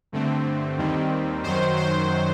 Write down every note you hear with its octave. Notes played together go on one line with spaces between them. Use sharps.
G2 D3 A3 C4
D#2 D#3 G3 C4
F#2 D#3 F#3 C5
C5